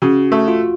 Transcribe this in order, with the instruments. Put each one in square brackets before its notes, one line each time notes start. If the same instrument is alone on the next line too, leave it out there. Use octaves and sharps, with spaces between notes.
[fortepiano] C#3 [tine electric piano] F#4
[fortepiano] A3
[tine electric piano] F4